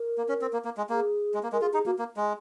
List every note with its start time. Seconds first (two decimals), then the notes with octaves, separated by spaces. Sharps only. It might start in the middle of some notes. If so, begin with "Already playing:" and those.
Already playing: A#4
0.18 A#3
0.29 C#4
0.41 C4
0.53 A#3
0.65 A#3
0.77 G#3
0.89 A#3 G#4
1.34 G#3
1.43 A#3
1.52 G#3 A#4
1.62 F4 G#4
1.73 D#4 G#4
1.86 A#3 F#4
1.99 A#3
2.17 G#3